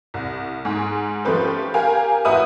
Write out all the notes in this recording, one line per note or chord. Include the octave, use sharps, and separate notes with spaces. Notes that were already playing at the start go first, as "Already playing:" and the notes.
C2
G#2 G#4
F3 A3 C#4 G4 B4 C5
G4 A#4 F5 G#5
A1 E4 F#4 B4 D#6